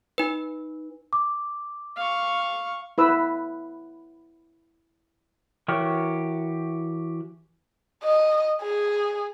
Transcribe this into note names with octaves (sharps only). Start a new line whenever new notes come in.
D#4 B4
D6
F5 C#6
E4 B4 E6
E3 F#4 G4 A#4 C#5
D#5
G#4